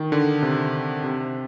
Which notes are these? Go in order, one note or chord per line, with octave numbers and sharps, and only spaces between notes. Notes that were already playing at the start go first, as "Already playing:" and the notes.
Already playing: D#3
D3
C3
C3